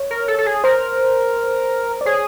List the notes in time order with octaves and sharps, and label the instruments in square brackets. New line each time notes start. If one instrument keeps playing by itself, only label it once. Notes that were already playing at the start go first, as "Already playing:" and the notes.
Already playing: [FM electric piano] C#5
[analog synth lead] A#4
A4
A4
G#4
[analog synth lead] A#4 [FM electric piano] C5
[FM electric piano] D5
[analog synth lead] G#4 [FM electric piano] C#5